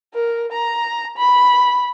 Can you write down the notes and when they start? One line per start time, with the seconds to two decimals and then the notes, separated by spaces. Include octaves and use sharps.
0.14 A#4
0.52 A#5
1.17 B5